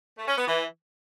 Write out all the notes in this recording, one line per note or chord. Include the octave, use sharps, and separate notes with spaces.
A3
C#4
B3
E3